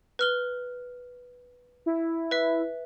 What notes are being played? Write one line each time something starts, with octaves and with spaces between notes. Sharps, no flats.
B4 F6 G7
E4
B4 E5